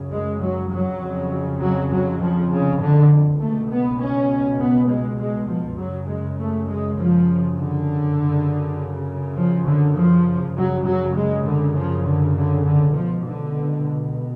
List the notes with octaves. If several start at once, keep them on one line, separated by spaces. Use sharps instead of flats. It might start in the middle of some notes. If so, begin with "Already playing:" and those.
Already playing: F#2 C#3
G#3
F#3
F#3
F2 C#3
F#3
F#3
F3
C#3
D3
C#2 B2 A3
B3
C#4
B3
G#3
G#3
F3
F#2 C#3 F#3
G#3
A3
G#3
F3
D3
F#2 C#3
F3
D3
F3
F#2 C#3 F#3
F#3
G#3
D3
F3
D3
D3
D3
C#2 B2 F3
D3